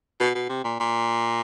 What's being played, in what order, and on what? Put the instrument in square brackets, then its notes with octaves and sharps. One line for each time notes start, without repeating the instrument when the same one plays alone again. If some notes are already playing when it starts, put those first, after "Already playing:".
[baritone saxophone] B2
B2
C3
A#2
A#2